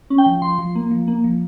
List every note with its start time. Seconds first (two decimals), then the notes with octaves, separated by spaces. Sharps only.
0.10 C#4
0.18 G5
0.26 F3
0.42 F3 C6
0.59 F3
0.75 A#3
0.91 F3
1.07 A#3
1.24 F3